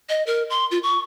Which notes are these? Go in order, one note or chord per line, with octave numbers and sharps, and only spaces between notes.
D#5
A#4
C6
F4
C#6